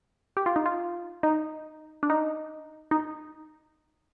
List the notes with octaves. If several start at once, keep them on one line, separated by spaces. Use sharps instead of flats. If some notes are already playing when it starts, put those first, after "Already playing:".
G4
F4
D#4
F4
D#4
D4
D#4
D#4